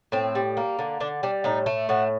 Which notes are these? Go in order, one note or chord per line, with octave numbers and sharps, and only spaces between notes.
A2 C4
G3
A#3
D3
D3 D4
G3 D4
A2 D#4
A3
A2 F#4